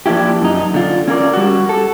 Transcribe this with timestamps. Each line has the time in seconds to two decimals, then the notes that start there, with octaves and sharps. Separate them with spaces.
0.06 F3 A#3 D4 E4 G4
0.42 F#2 D#4
0.74 D3 F4
1.08 C#4 F4 A#4 D5
1.33 G3 F#4
1.69 A4